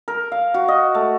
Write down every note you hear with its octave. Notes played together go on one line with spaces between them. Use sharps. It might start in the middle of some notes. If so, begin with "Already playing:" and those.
A#4
F5
F#4
D#5
A3